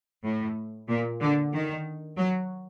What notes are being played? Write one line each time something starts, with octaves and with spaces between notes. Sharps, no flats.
A2
A#2
D3
D#3
F#3